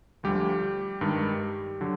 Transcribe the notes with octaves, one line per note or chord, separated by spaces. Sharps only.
D2 D3 F3 G3 G4
G2 D#3 G#3
D3 F#3